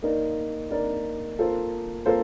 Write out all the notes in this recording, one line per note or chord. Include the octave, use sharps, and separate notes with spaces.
A#3 D#4 A#4 D5
A#3 D#4 A#4 D5
A#3 F4 A4 C5
A#3 F4 A4 C5